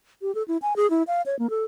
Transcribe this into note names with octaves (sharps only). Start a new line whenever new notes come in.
G4
A4
E4
G#5
G#4
E4
F5
C#5
A#3
A4